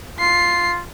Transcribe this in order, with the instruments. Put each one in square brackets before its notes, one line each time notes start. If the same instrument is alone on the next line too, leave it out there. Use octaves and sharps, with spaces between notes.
[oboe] F4 [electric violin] C7